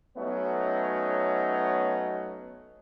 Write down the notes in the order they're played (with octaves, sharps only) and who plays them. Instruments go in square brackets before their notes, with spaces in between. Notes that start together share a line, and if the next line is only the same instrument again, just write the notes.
[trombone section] F#3 A3 B3 C#4 D#4